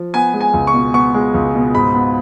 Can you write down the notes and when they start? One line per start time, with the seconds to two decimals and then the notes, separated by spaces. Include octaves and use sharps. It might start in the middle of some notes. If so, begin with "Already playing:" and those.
Already playing: F3
0.14 B3 G#5
0.34 G#3
0.41 G#5
0.53 C#2
0.67 C#6
0.74 B2
0.94 B3 C#6
1.14 G#3
1.34 C#2
1.55 B2
1.74 G#2 B5
1.95 B3